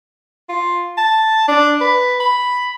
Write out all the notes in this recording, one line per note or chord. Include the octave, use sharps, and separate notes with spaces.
F4
A5
D4
B4
B5